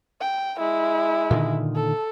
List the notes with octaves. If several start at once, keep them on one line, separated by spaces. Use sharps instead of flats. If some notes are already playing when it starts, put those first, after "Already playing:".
G5
G#3 E4
A#2 D3 D#3
A4